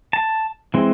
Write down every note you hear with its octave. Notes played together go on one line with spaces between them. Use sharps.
A5
E3 G#3 C4